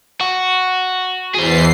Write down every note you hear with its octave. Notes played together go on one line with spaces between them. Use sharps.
F#4
E2 G#4 C5 C7